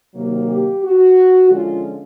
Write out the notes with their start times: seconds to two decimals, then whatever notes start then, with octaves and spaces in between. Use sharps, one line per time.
0.15 C3 D#3 F#3 A#3
0.49 G4
0.83 F#4
1.50 D3 F3 G#3 C#4 F4